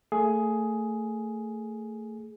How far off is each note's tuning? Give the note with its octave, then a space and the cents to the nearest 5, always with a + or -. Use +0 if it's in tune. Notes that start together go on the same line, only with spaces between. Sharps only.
A3 +25 G#4 +10